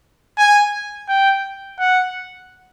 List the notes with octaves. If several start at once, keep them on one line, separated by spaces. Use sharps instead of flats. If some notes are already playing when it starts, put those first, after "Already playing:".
G#5
G5
F#5